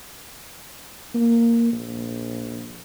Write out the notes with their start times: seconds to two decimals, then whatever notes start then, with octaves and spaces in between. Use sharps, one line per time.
1.15 A#3
1.72 A#1